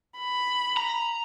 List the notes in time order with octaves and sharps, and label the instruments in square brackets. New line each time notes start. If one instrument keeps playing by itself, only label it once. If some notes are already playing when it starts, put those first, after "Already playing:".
[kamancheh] B5
[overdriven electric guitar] A#5